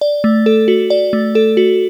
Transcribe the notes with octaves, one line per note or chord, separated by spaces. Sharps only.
D5
A3
A4
F#4
D5
A3
A4
F#4